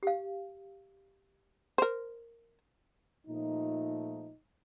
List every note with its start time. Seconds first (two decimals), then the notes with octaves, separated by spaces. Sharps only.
0.03 G4 F5
1.78 A#4 C5
3.27 A#2 F3 A3 D#4